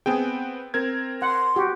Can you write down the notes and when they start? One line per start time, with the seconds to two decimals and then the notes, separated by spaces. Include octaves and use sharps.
0.06 B3 C4 G#4 G5
0.74 C4 A#4 G#6
1.22 F#5 C6
1.56 F#4 G4